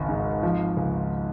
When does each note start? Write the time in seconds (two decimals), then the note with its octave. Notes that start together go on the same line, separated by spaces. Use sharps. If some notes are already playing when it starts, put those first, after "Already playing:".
Already playing: G#1 C#2
0.09 G#2
0.43 F3
0.77 C#2